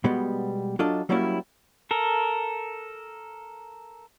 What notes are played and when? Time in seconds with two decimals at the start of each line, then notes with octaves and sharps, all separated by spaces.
0.04 B2 G3 G#3 B3
0.79 F#3 D4 F4 A4 D#5
1.09 F#3 G3 A#3 C#4 E4
1.91 A4 A#4